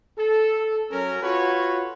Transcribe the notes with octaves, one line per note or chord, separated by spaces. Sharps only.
A4
F#3 C#4 A#4
F4 F#4 A4 B4 C#5